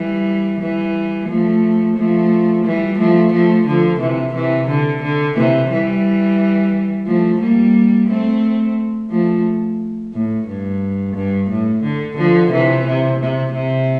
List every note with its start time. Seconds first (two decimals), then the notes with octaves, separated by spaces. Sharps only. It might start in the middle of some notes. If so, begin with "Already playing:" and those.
Already playing: E3 G3
0.60 E3 G3
1.28 F3 A3
1.96 F3 A3
2.65 E3 G3
2.98 F3 A3
3.32 F3 A3
3.67 D3 F3
4.00 C3 E3
4.34 C3 E3
4.68 D3
5.02 D3
5.36 C3 E3
5.70 E3 G3
7.06 F3 A3
7.41 G3 A#3
8.08 A3 C4
9.10 F3 A3
10.13 A2
10.48 G2
11.15 G2
11.49 A2
11.83 D3
12.17 D3 F3
12.51 C3 E3
12.86 C3
13.19 C3
13.53 C3